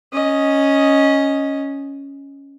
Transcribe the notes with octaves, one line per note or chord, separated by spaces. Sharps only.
C#4 D#5